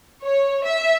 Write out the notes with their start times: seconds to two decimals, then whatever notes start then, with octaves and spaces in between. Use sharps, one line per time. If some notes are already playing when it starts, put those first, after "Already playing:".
0.24 C#5
0.66 E5